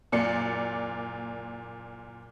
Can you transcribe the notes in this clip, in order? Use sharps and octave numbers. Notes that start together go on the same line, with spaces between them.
F#1 A#2 A#3 D5 C#7